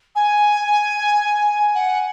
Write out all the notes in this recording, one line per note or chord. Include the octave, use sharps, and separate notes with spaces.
G#5
F#5